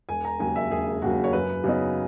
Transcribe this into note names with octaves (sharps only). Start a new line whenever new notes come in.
E1 G#5
A#5
D#2 C#3 F#3 G#5
E5
E1 G#4
D#2 C#3 F#3 F#4
C#5
F#2 B4
C#3 F#3 B3 D#4